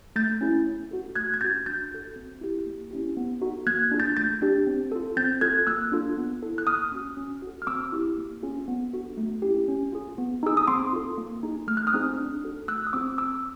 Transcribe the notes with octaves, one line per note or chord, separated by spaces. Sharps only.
A3 G6 A6
C#4 E4 G#4
C#4
F#4 A4
A3 F#6 G#6
G#6
C#4 F#4 G6 A6
D4 G6 A6
F#4 A4
C4
E4 G4
A#3
C#4 E4 G4
B3
D#4 F#4 A4
A#3 F#6 G#6
D4 F4 G#4
G6 A6
A3 G6 A6
D4 G4
C4
F4 A4
C4 G6 A6
F4 A4 F#6 G#6
A#3 E6 F#6
D4 F4 A4
B3
E4 A4
F#6
A#3 D#6 F6
C#4 F#4
C#4
F#4 A4
F6
C4 D6 E6
E4 G4
A#3
C#4 F4 G#4
B3
D4 F#4 A4
A3
C#4 E4 G4
C#4
F4 G#4
B3
D#4 G#4 E6
D#6
C4 C6 D6
F4 A4
A#3
D#4 G#4
A3 F6
F#6
D#6 F6
C4 D#4 G#4
D4
F#4 A4
A3 E6 F#6
D#6
C4 F4 G#4 D6 E6
C4 D6 E6